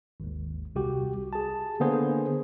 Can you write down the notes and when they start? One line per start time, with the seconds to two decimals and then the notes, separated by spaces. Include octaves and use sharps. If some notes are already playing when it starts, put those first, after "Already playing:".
0.20 G#1 D#2
0.75 C2 F#4 G4
1.33 G#4 A5
1.80 D3 A#3 B3 G#4 C5